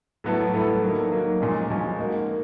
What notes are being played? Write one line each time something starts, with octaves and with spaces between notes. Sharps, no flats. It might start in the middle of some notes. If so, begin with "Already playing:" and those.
A2 F#3 B3 E4 A4
A2 F#3 B3 E4 A4
D#3 F#3 A#3
D#3 F#3 A#3
A#2 F3 G#3 C#4
A#2 F3 G#3 C#4
A#3 D#4 F#4
A#3